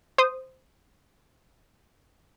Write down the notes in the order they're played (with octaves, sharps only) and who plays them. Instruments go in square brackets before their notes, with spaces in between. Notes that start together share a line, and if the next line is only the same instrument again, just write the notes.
[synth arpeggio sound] C5 D#6